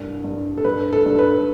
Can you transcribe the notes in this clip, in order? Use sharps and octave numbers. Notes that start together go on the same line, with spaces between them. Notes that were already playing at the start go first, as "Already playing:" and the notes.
Already playing: C2 G2
G2
A4
G2 B4
A4
G2
B4